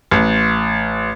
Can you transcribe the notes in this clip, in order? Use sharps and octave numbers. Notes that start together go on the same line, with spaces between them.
A1